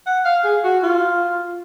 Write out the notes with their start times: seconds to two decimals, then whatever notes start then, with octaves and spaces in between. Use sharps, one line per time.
0.06 F#5
0.25 F5
0.44 G#4
0.64 F#4
0.83 F4